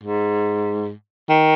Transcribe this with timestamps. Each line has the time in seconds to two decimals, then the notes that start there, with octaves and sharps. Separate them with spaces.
0.03 G#2
1.29 D#3